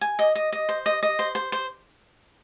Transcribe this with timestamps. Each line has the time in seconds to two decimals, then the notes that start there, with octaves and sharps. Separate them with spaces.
0.01 G#5
0.19 D#5
0.36 D#5
0.53 D#5
0.69 C5
0.86 D#5
1.03 D#5
1.19 C5
1.35 C5
1.52 C5